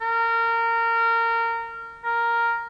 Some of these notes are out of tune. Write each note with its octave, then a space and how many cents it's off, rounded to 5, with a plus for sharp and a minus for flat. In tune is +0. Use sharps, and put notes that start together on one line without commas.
A#4 -20
A#4 +0